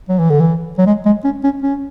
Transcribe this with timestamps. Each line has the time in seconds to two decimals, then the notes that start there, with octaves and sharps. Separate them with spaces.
0.09 F#3
0.19 E3
0.30 D3
0.40 E3
0.78 F#3
0.86 G#3
1.05 G#3
1.24 C#4
1.44 C#4
1.62 C#4